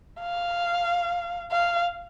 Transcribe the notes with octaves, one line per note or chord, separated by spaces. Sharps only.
F5
F5